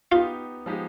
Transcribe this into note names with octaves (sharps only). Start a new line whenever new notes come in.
B3 D#4 F4 G4
F3 G#3 B3 D#4 G4